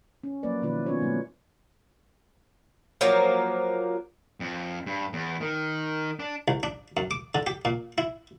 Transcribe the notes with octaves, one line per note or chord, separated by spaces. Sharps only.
C#4
F3 F#3 A#3 B4 D5
B2 D#3 F3 A#3 E4 B4
B3 C#4 F4 C#5
B2 F#3 A3 A#3 E4
F3 F#3 A#3
F2
G2
E2
D#3
D4
C2
D4
F#2
D6
D3
G4
A#2
E4